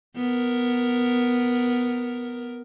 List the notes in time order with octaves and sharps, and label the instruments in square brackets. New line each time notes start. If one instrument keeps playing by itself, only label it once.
[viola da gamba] B3 A#4